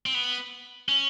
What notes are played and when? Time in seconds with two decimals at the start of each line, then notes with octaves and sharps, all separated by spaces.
0.06 C4
0.14 B3
0.89 C#4